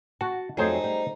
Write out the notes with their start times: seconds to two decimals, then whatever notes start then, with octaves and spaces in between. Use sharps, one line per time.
0.21 F#4 A5
0.57 F2 F#3 A3 D#4 G#4 C5
0.84 G3